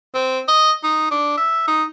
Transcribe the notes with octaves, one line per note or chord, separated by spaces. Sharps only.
C4
D#5
D#4
D4
E5
D#4